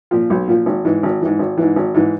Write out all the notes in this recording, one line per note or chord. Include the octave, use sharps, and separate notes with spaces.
A#2 F3
B1
A#2 F3
G#1
G#2 E3
G#1
G#2 E3
G#1
G#2 E3
G#1
G#2 E3